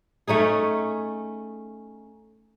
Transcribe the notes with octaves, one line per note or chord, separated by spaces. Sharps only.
A3 C#4 D#4 G#4